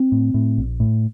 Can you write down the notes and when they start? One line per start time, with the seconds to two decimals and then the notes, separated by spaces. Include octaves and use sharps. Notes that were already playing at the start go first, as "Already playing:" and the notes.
Already playing: C4
0.12 A2
0.34 A2
0.58 A#1
0.80 A2